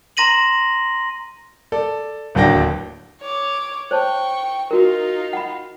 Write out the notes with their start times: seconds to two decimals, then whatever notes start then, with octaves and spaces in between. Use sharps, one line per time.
0.17 A#5 C6 A#6 D#7 F#7
1.72 A4 D5
2.35 D1 D#2 F#3 D4 G5 A#6
3.21 C#5 D6
3.91 C5 C#5 G5 A5 C#6
4.71 D#4 F4 F#4 A#4
5.33 F#5 B5